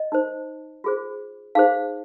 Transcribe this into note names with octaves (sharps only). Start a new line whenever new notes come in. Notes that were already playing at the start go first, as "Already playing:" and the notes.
Already playing: D#5
D#4 C5
F4 G#4 C5
D#4 G#4 C5 F5